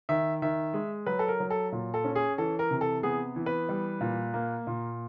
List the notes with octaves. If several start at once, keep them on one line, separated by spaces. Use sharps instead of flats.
D#3 E5
D#3 E5
G#3
F#3 B4
A4
A#4
F#3
A4
A#2
A4
C#4
G#4
E3 A4
A#4
C3
A4
B3 G#4
E3
B4
G3
A#2
A#3
A#2